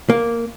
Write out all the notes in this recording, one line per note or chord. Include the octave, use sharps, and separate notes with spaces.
A#3